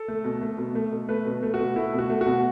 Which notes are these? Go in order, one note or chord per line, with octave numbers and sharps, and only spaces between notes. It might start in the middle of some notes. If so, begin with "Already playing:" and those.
Already playing: A4
A3
B2
A3
B2
A3
B2
A3 B4
B2
A3
F#4
B2
A3 E4
B2
F#4
A3
F#4
B2